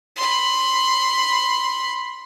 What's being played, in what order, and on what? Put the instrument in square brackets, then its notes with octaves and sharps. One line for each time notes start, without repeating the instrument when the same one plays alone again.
[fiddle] B5 C6